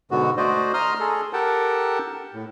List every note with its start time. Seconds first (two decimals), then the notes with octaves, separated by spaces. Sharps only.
0.11 G#2 B2 D3 B3 F#4
0.37 A3 F#4 C5 D5 D#5
0.74 A#5 C6 D#6 F6
1.00 G#4 A4
1.33 G4 A4 A#4 F#5 G5 A5
2.34 A2